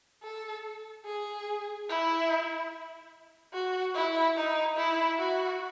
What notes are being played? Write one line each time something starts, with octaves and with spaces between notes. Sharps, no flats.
A4
G#4
E4
F#4
E4
D#4
E4
F#4